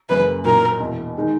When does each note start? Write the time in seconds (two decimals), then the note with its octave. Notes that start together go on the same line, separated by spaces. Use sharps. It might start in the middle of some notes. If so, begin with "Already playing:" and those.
0.09 F#1 F#2 C#3 B4
0.44 B1 A#2 F#3 A#4
0.80 E1 E2 B2
1.17 D#3 G#3 D#4